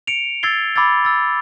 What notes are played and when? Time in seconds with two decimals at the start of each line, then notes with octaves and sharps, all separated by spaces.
0.07 C#7 D7 F7
0.43 E6 G#6 A6 C7 G7
0.76 B5 D6 E6 G#6 A6
1.05 E6 A6